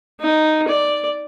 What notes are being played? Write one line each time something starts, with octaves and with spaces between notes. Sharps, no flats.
D#4
D5